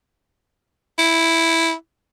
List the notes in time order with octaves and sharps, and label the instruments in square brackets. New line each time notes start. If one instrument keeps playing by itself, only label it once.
[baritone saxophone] E4